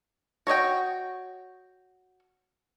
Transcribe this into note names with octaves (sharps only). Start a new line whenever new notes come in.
F#4 C#5 D#5 G5